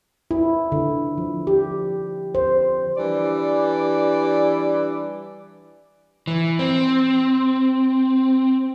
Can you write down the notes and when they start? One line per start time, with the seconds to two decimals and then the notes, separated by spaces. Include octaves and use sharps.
0.31 E4
0.72 D3
1.18 F3
1.47 G4
2.35 C5
2.97 E3 G3 D4 D5
6.27 E3
6.59 C4